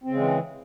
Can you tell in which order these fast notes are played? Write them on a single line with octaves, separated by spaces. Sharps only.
C4 C#3 G#3 E3